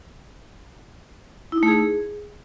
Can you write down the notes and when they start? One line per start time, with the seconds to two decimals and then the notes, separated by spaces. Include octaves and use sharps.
1.52 E4
1.58 D#4
1.63 A3
1.68 G#4